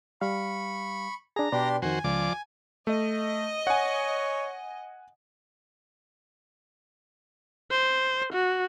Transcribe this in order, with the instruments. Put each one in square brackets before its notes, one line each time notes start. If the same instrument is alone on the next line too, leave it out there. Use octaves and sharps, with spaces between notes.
[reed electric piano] G3 F5 [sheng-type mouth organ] B5 C#6
[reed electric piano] D4 G#4 [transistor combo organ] A#5
[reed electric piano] B2 B4 D5 [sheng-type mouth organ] D4 G4 C6
[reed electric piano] F2 D#3 [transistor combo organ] F#4 C5 [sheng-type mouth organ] G#5
[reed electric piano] C#2 [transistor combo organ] F3 D5 D6
[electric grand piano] A3 [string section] D#5
[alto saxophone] C#5 [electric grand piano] F#5 G#5
[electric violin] C5
F#4